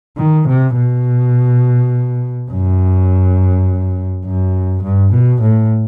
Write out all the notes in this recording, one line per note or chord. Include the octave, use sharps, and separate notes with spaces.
D#3
C3
B2
F#2
F#2
G2
B2
A2